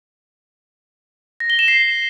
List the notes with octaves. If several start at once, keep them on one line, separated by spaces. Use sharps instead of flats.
A#6
G7
E7
C7